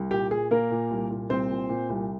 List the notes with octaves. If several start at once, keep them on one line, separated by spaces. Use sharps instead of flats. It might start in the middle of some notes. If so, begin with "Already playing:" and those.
Already playing: C2
A#2 G4
A#2 G#4
A#2 A#3 A#4
A#2
C2
A#2
C2 C4 C5
A#2
A#2
C2